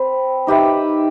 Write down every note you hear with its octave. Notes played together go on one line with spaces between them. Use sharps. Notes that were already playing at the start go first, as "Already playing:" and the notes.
Already playing: C4 B4
D#4 G4 B4 E5